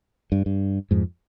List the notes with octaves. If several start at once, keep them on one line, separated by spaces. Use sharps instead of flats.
G2
G2
F2 G#2